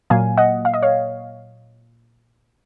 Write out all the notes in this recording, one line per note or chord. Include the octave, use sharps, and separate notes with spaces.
A#2 F#3 A#3 F5 G#5
D#5 F#5
F5
D#5
C#5 F5